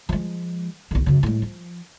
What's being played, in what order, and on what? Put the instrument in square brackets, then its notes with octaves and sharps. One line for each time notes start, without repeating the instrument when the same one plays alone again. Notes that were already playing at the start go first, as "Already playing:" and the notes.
[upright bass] F3 G#3
B1 D#3
F#2 C#3
A2 G#3
F3